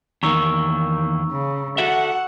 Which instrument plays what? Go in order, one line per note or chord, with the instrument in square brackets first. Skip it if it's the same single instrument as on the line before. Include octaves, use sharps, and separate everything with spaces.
[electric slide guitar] E2 D#3 A#3 [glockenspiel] A#5 C#6 E6
[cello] C#3
[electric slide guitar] F#4 A4 E5 [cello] F#5